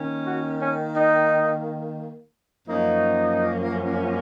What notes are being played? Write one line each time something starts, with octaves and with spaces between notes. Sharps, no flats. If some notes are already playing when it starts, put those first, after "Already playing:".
Already playing: D#3 A#3 C#4
F#4
C#4
D#4
F#2 F3 A#3 C#4 D#4